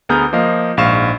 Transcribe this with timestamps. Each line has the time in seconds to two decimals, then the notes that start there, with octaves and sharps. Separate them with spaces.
0.09 D2 B3 G#4 A#5 F6 G6
0.33 F3 A#3 D#5 F5
0.77 A#1 G#2 F5 C#6 E7